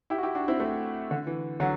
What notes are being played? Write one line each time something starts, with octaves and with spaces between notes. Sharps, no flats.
E4 G4
F#4
E4 G4
D4 F#4
C4 E4
A3 C4
D3
E3
D3 F#3